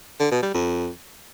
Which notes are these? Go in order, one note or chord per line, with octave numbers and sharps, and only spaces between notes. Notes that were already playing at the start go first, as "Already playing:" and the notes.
D3
B2
G3
F2